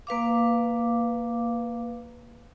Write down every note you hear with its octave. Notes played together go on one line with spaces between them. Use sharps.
A#3 B4 F5 D6